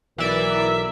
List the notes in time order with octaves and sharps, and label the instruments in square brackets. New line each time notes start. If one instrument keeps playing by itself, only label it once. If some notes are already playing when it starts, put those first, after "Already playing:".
[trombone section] B1 A#4 [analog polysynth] E3 D5 [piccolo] E5